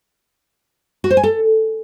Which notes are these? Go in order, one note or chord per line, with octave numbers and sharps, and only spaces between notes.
F#4
C5
G#5
A4